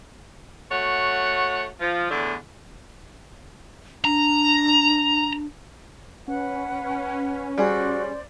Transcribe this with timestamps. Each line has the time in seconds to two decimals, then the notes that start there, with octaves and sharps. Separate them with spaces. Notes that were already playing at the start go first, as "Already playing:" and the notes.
0.71 A3 F#4 C#5 F#5
1.80 F3
2.10 E2 A2 D3
4.05 D4 A#5
6.28 C#4 B4 F#5
7.58 G3 F#4 G#4 C5 D5